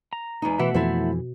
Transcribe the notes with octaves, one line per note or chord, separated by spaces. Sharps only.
A#5
E2 G#3 D#4
B2 E3 A3 E5 F#5
F2 E3 E4 A4 C5